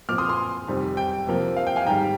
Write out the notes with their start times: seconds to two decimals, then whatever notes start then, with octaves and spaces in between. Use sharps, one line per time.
0.09 A#2 F3 C4 D6 F6
0.18 C6 D#6
0.29 G#5 C6
0.68 F2 C3 D#3 G3
0.97 G5
1.27 C3 F3 A#3
1.57 F5
1.67 G5
1.76 F5 G#5
1.86 G#2 D#3 G3 G5 A#5